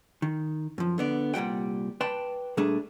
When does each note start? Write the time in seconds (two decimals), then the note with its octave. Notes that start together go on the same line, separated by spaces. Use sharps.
0.22 D#3
0.78 F#2 F3
0.98 D3 B3 D5
1.34 C2 A#2 G3 F#5 G5
2.01 B4 D5 G5 A5 C6
2.57 A#2 G3 A3 D4 G#4